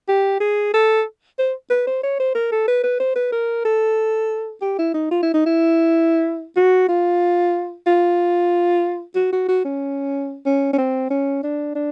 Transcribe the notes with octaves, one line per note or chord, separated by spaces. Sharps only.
G4
G#4
A4
C5
B4
C5
C#5
C5
A#4
A4
B4
B4
C5
B4
A#4
A4
G4
E4
D#4
F4
E4
D#4
E4
F#4
F4
F4
F#4
F#4
F#4
C#4
C#4
C#4
C4
C#4
D4
D4